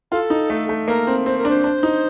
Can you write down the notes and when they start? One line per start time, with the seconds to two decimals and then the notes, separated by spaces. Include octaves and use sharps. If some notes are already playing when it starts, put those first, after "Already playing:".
0.12 F4 A4
0.30 D#4
0.50 A3
0.69 A3
0.88 A#3 A#4
1.07 C4
1.26 C4 C5
1.38 A#4
1.45 D4
1.49 C5
1.64 D4
1.83 D#4